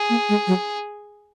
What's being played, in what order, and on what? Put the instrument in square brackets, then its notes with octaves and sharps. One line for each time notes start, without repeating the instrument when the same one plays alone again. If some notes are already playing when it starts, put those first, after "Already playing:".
Already playing: [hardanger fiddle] G#4
[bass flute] A#3
G#3
F#3